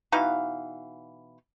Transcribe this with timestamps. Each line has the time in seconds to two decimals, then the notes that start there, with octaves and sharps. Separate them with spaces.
0.12 B2 E3 D#4 F5